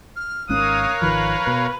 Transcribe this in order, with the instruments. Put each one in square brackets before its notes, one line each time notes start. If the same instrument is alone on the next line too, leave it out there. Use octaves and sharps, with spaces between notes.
[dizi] F6
[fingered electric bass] G#1 G#2 C#4 [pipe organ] A#4 C#5 F5 [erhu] D#6 [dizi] F#6
[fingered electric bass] G#1 D#3 F3 [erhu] B4
[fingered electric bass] B2